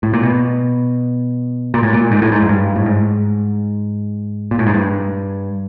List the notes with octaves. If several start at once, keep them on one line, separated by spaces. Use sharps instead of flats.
A2
A#2
B2
A#2
A2
A#2
G#2
A2
G#2
F#2
G2
A2
G#2
A#2
A2
G#2
G2